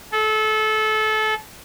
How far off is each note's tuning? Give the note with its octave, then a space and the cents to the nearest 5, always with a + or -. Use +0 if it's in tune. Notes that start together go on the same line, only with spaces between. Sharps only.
A4 -25